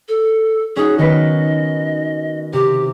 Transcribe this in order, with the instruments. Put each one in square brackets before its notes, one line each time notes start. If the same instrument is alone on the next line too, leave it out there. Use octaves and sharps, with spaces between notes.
[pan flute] A4
[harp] C#4 D#4 F#4 [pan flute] G#4
[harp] D#3 B3 B4 [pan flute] D#5
[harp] C3 C4 [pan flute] G4